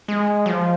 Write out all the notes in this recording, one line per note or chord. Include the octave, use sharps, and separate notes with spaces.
G#3
F#3
F3